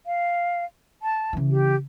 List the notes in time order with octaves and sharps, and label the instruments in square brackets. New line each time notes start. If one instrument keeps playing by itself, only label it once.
[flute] F5
A5
[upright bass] C#3 E3
[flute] G4